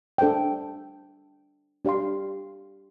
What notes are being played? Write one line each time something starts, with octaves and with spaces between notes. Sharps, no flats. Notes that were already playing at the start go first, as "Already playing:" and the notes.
D4 A4 C5 G5
D4 G4 D5 F5 C6